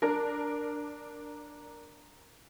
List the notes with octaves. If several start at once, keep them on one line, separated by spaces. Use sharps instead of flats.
D4 A#4